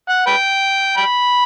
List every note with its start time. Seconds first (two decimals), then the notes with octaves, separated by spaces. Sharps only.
0.09 F#5
0.27 B4 G5
0.97 G5 B5